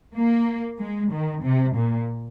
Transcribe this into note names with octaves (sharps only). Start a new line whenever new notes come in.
A#3
G#3
D#3
C3
A#2